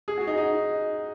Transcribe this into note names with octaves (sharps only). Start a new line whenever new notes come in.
G#4
F#4
D#4
D#4